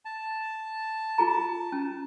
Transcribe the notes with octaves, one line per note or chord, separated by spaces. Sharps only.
A5
F4 G#4 A#5
C#4